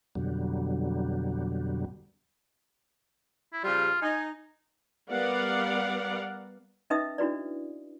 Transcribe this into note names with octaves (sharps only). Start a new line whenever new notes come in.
F2 B2 D3 F#3 G3
E4
C#3 F3 G3 F4
D#4 G#5
G3 B3 A#4 D5 F5 F#5
C#4 D#4 B4 D#5 E5 D#6
D4 E4 F#4 B4 D5